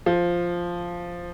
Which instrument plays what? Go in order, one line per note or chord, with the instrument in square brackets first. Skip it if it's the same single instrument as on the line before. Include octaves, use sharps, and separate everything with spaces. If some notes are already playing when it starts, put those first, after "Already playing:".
[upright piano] F3